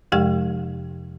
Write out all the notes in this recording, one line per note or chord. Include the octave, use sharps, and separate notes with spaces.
F2 C3 F3 G#3 G4 G5